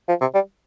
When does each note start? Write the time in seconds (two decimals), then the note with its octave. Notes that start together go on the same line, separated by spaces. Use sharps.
0.09 F3
0.21 C3
0.35 G3